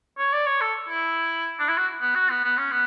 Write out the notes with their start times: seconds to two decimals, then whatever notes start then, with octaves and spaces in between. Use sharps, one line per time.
0.18 C#5
0.33 D5
0.46 C#5
0.61 A4
0.89 E4
1.59 D4
1.68 E4
1.77 F#4
2.01 B3
2.15 F#4
2.30 B3
2.44 B3
2.57 C#4
2.71 B3